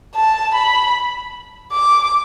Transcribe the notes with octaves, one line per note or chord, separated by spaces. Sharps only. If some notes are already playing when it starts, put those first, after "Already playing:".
A5
B5
D6